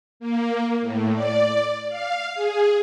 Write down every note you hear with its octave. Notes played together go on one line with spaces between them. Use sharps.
A#3
A2
D5
F5
G#4